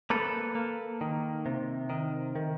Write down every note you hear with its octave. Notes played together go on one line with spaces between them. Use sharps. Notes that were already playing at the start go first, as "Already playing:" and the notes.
A#3 A4 B4
A#3
D#3
C3
D#3
D#3